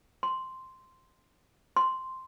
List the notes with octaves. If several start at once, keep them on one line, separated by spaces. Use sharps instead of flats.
C6
C6